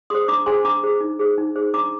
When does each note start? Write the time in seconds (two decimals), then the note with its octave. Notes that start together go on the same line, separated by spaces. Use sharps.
0.10 G#4 C5 C6 D#6
0.28 D4 A#5 D6
0.46 G#4 C5 G#5 C6
0.64 D4 A#5 D6
0.83 G#4 C5
1.00 D#4
1.19 G#4 C5
1.38 D#4
1.56 G#4 C5
1.74 D4 A#5 D6